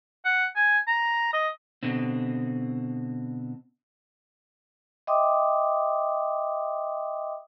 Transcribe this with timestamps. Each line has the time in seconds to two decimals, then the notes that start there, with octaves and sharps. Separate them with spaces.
0.25 F#5
0.56 G#5
0.87 A#5
1.33 D#5
1.83 B2 D3 C4
5.07 D#5 E5 G5 C6 D6 D#6